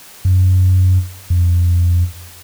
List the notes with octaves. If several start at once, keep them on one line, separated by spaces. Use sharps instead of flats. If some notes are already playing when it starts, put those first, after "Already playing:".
F#2
F2